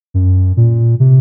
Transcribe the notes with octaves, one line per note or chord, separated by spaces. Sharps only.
F#2
A#2
C3